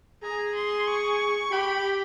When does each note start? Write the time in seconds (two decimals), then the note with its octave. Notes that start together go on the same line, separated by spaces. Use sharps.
0.23 G#4 A#5
0.55 C6
0.87 C#6
1.51 G4 B5